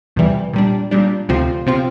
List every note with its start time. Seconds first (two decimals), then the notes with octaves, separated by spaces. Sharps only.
0.16 E2 C3 E3 G3
0.53 A#2 G3 D4
0.91 A#2 G3 D4
1.29 D2 C3 F3 C4 F4
1.66 C3 F3 C4 F4